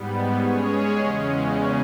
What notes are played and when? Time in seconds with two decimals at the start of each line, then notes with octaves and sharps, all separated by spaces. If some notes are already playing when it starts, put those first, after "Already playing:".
Already playing: G#2 G3 B3
0.34 G#3 C#4 G#4 C#5
0.95 E2 C#3 G#3 C#4